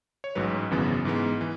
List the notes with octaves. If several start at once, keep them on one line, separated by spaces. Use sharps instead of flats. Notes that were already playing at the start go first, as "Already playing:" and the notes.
C#5
A1 G#2 F#3 B4
G#1 F#2 C#3 E3 B3
G#2 E3 G#3 B3
E3